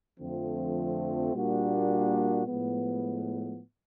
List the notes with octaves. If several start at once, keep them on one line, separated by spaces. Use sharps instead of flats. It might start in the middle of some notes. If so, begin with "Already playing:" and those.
F2 D3 F3 A3 C4
A#2 G3 A#3 D4 F#4
A2 F3 G#3 B3